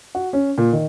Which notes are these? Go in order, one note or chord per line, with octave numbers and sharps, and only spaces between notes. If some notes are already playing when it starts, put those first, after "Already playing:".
F#4
C#4
A#2
D#3